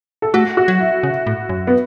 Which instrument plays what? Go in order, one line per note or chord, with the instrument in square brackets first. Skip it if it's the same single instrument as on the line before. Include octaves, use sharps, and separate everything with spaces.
[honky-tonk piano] A4
[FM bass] A3 [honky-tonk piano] F#4
[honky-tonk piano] F#4
[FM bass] F#3
[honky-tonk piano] E4
[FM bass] C#3
A2
F#2
[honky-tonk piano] B3